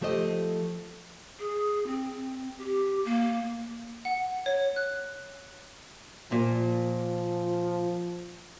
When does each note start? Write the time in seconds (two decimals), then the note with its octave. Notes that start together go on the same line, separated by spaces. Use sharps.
0.01 F3 A3 G4 C5 D#5
1.39 G#4
1.87 C4
2.58 G4
3.05 A#3
4.05 F#5
4.46 C#5
4.76 F#6
6.32 A#2 F3